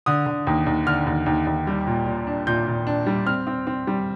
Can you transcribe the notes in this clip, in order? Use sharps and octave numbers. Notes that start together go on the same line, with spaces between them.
D3 D#6
D3
D#2
D#2
D3 F6
D#2
D#2
D#2
G3
A#2
A#2
D4
A#2 G6
A#2
D4
G3
C4 F6
C4
C4
G3